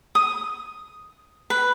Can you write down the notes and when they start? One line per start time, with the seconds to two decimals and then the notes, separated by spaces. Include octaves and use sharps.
0.15 D#6
1.50 B4